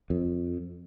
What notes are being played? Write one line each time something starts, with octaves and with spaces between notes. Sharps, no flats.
F2